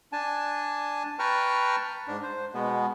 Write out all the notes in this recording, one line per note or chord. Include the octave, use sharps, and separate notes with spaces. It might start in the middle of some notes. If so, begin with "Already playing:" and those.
D4 G#5 A5
B4 G5 A5 A#5 C#6 F6
G#2 D4
C5
B2 G#3 B3